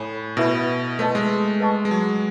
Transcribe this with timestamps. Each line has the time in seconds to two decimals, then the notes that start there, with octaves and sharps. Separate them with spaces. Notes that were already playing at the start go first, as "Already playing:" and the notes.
Already playing: A2 A4 C#5 G#5 B5
0.37 B2 E4 B4 E5 B5
0.99 A3 F#4 B4 D#5 A5
1.15 G#3
1.60 B4 D#5 A5 C#6
1.85 G#3
1.91 F#3